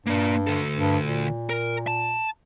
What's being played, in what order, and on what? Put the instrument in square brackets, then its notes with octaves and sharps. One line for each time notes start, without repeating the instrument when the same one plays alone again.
[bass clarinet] G2 [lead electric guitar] A#3 D5
[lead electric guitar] D2 A4
[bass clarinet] G2
A#2
[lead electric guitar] A#4
A5